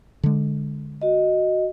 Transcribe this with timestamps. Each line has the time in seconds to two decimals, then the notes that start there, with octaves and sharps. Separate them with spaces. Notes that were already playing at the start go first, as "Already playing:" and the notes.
0.23 D3 G#3
1.01 F#4 D#5